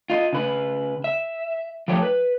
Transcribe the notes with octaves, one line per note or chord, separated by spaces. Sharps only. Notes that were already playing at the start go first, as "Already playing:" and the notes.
F4 D#5
C#3 B4
E5
F3 A3 G4 C#5
B4